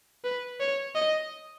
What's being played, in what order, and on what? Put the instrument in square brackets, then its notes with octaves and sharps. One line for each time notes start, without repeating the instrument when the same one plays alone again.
[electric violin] B4
C#5
D#5